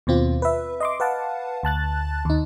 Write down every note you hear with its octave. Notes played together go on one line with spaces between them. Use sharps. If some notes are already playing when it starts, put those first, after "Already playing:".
D#2 B2 C4 F4
B4 E5
D#5 C6 D6
B4 F5 F#5 A5
D2 A5 F#6 A6
D#2 D#4